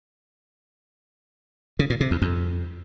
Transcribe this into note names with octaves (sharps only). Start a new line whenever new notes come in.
C#3
A#2
C3
E2
F2